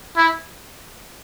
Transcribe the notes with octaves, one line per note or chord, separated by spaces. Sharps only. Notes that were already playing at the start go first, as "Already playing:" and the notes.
E4